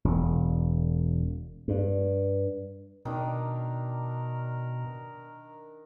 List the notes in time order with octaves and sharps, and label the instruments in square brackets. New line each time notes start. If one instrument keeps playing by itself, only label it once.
[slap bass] E1
G2
[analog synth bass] B2 [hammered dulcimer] D#3 D4 [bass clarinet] A#4